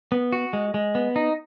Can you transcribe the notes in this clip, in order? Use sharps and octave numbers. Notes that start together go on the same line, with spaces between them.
B3
F#4
G#3
G#3
B3
D#4